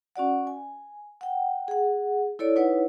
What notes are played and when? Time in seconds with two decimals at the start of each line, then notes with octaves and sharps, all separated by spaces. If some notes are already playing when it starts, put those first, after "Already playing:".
0.16 C#4 F#4 D5 F#5
0.47 G#5
1.21 F#5 G5
1.68 G#4 F#5
2.39 E4 A4 C#5 D5
2.56 D#4 E4 B4 C#5 F#5